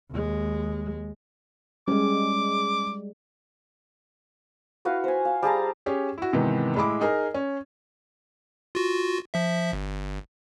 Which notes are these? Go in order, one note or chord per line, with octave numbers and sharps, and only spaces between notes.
D#2 G#3
G3 G#3 C#4 D6
E4 F#4 B4 F5
C5 G#5
F5
G3 G#4 A5 A#5
C#4 G4 G#4
E4 F#4
G#2 C3 D#3 E3 B3
A2 G#3 E4 B5 D6
D#4 G#4 A#4 A#5
C#4
F4 F#4
F3 E5
G1